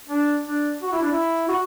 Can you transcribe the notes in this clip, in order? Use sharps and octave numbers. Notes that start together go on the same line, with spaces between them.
D4
D4
F#4
E4
D4
E4
F#4